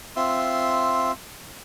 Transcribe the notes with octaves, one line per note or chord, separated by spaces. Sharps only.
C4 F4 E5 C6